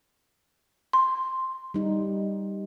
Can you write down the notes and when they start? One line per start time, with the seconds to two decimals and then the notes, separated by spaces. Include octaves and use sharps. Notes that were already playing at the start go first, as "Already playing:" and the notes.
0.93 C6
1.74 G3 D#4